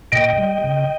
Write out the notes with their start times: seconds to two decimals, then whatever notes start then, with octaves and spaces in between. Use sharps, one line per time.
0.12 A#2 D#5 G5
0.38 G3
0.64 C#3